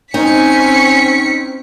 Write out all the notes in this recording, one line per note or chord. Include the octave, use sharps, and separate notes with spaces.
C4 C#4 D#4 G#5 B6 C#7